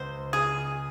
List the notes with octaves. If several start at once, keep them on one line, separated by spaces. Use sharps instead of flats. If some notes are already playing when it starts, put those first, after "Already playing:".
Already playing: C#2 C5
C#3 G#4